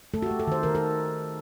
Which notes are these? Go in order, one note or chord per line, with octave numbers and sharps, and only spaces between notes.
A3 A4
F#4
G4
A3
A4
D#3 C5
D#3 A#4
A4